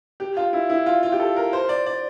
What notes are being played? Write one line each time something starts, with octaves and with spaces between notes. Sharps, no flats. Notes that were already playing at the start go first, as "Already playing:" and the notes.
G4
F4
E4
E4
F4
F4
G4
A4
A#4
C5
D5
D5